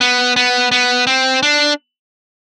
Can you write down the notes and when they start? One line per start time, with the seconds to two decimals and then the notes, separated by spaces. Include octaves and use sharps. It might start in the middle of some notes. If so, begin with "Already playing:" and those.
0.01 B3
0.36 B3
0.72 B3
1.07 C4
1.43 D4